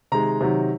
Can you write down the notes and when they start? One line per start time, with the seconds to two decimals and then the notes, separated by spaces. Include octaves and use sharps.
0.12 C3 D#3 G#3 A#5
0.41 C3 D#3 F#3